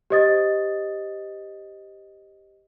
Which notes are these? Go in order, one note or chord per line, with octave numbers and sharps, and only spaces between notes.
G4 C5 D#5 D#6 A6